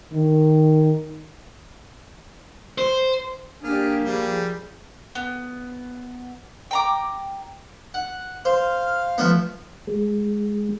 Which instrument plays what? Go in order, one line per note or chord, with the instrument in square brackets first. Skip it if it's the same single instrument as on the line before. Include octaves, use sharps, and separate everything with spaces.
[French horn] D#3
[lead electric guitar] C5
[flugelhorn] A#3 [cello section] D4 G4 [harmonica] G#4 F6
[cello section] F3 G#4 [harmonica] G3
[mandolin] B3
G5 A#5 D6
[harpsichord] F#5
[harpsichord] C5 [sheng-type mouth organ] F5 F6
[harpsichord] F3 A3 B3
[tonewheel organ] G#3